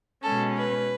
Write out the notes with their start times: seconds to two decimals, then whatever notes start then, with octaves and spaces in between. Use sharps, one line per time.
0.23 B2 G#3 C#4 A4
0.56 B4